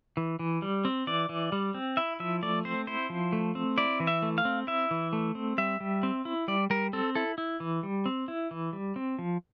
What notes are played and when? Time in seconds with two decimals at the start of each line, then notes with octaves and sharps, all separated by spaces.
0.17 E3
0.39 E3
0.62 G3
0.85 C4
1.07 E3 D5
1.29 E3
1.52 G3
1.74 C4
1.97 E4 E5
2.20 F3 E5
2.43 A3 D5
2.65 C4 C5
2.87 E4 C5
3.10 F3
3.33 A3
3.55 C4
3.78 E4 D5
4.00 E3
4.07 E5
4.22 A3
4.38 F5
4.45 C4
4.67 E4 E5
4.91 E3
5.13 A3
5.35 C4
5.58 G3 E5
5.80 G3
6.03 C4
6.25 E4
6.48 G3 D5
6.70 G3 A#4
6.93 C4 A4
7.15 E4 A4
7.38 E4
7.60 E3
7.83 G3
8.06 C4
8.28 E4
8.51 E3
8.73 G3
8.96 C4
9.19 F3